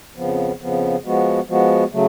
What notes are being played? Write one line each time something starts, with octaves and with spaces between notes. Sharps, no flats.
F2 C#3 F3 B3
F2 C#3 F3 B3
F3 G#3 B3 F#4
F3 G#3 B3 F#4
C#3 F#3 A3